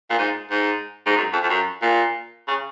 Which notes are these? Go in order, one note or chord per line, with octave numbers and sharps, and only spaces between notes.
A#2
G#2
G#2
G#2
F#2
F2
F2
F#2
A#2
C#3